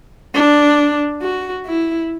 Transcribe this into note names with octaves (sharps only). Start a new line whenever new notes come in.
D4
F#4
E4